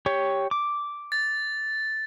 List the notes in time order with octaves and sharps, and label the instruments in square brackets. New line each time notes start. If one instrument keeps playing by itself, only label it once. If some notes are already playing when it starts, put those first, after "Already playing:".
[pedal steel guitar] G4 C#5
D6
[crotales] A6